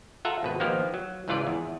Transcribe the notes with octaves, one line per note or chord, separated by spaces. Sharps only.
F4 A4 E5 F#5 A#5
G#1 B2 B4
D#3 F3 A#3 B3 G4 A#4
F#3
C#2 G#2 E3 F4 B4 D5
E2